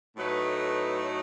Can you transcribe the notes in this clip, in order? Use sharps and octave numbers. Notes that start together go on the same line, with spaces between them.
A2 F#3 A3 D#4 B4
B4